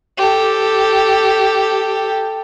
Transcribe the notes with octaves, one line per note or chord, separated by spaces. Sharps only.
G4 A4